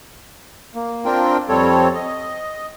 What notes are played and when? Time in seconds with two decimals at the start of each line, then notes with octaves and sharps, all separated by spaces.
0.75 A#3
1.05 C4 D4 F4 A#4 G5
1.49 F2 G3 C4 A4 C#5
1.94 D#5